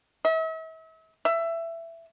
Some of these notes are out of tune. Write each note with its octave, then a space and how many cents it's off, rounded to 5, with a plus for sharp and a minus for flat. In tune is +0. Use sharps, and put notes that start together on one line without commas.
E5 -40
E5 +15